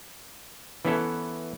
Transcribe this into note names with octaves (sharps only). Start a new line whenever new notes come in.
E3 B3 C#4 E4 A4